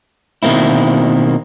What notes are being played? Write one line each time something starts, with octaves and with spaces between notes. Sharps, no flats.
B2 D#3 A#3 C4 E4